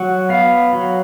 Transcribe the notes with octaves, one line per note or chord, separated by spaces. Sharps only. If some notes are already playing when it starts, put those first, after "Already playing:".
Already playing: F#3 F#5
B3 F5
F#3